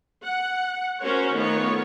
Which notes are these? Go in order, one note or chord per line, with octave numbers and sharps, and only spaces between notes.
F#5
C#4 F#4 A#4 C5 C#5
D#3 A3 B3 F4 C#5